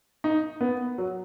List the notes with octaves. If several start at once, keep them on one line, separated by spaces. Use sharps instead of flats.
D#4
B3
F#3